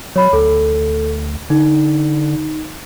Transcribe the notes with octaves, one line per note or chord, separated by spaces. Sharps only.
F#3 C#5 B5
D2 A4
D3 D#4